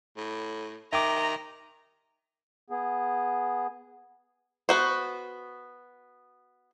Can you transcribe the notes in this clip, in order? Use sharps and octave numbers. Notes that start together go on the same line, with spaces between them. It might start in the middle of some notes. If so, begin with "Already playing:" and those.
A2
D#3 E5 G5 A#5 D6
B3 G#4
B3 F#4 C5